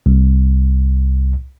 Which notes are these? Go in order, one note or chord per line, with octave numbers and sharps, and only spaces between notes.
C2